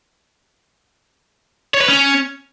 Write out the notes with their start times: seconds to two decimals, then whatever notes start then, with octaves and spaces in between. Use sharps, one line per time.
1.74 C#5
1.81 B4
1.88 C#4